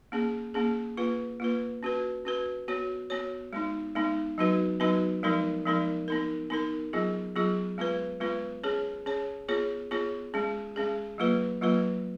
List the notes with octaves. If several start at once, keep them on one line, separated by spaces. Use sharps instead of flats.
A#3 C#4 G#4
A#3 C#4 G#4
A#3 F4 B4
A#3 F4 B4
C#4 F#4 B4
C#4 F#4 B4
B3 F#4 C#5
B3 F#4 C#5
G#3 B3 D#4
G#3 B3 D#4
F#3 B3 D#4 F#4 B4
F#3 B3 D#4 F#4 B4
F3 G#3 B3 D#4 A#4
F3 G#3 B3 D#4 A#4
B3 D#4 A#4
B3 D#4 A#4
F#3 B3 F4 G#4
F#3 B3 F4 G#4
G#3 B3 F4 B4
G#3 B3 F4 B4
C#4 G#4 C#5
C#4 G#4 C#5
B3 F4 G#4 C#5
B3 F4 G#4 C#5
G#3 C#4 G#4
G#3 C#4 G#4
F#3 A#3 F4 B4
F#3 A#3 F4 B4